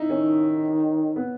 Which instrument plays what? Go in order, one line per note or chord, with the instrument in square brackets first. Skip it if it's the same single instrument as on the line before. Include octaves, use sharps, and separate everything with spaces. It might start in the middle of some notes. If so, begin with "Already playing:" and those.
Already playing: [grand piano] D#4 E4
[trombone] D#3 [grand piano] C#4
[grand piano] B3